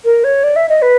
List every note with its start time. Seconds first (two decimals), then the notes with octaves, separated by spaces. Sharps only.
0.04 A#4
0.24 C#5
0.44 D5
0.56 E5
0.69 D#5
0.82 B4